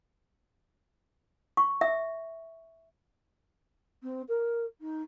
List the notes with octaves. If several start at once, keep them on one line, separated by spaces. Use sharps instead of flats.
C#6
E5
C4
A#4
D#4